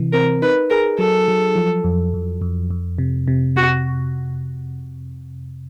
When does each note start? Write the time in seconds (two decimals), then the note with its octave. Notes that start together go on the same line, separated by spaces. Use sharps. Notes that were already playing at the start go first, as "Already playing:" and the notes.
Already playing: C3 E3
0.13 C4 A#4
0.42 D#4 B4
0.70 G#4 A#4
0.99 F#3 A4
1.28 F#3
1.56 F3
1.84 F2
2.14 F2
2.42 F2
2.71 F2
2.98 C3
3.28 C3
3.56 C3 F#4